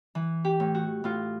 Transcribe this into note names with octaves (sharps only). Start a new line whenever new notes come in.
E3
G4
A2
F#4
A2 F4